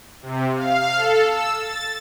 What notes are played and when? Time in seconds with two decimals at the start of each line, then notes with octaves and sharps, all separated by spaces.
0.22 C3
0.56 F5
0.96 A4
1.29 E6
1.59 A6